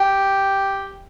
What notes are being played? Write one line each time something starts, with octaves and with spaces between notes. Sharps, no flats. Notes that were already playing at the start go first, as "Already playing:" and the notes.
Already playing: G4